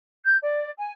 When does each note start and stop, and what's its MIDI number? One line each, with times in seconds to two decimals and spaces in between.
0.25 0.37 91
0.42 0.70 74
0.77 0.93 80